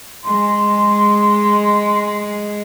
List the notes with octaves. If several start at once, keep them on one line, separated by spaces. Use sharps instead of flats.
G#3 C6